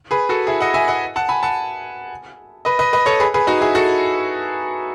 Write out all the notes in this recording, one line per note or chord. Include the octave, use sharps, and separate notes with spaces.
G#4 B4
F#4 A4
E4 G#4
D#5 F#5
E5 G#5
D#5 F#5
F#5 A5
G#5 B5
F#5 A5
B4 D#5
B4 D#5
B4 D#5
A4 C#5
G#4 B4
G#4 B4
D#4 F#4
E4 G#4
F#4 A4